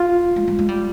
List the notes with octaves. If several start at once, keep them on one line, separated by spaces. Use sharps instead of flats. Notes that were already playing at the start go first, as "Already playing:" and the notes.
Already playing: F4
G#3
G3
G#3
G3